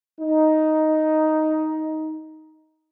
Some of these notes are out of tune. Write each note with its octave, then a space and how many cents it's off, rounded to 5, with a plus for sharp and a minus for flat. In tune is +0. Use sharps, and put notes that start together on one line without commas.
D#4 +5